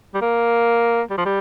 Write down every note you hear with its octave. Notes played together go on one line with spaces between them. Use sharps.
G3
A#3
G3
F3
G3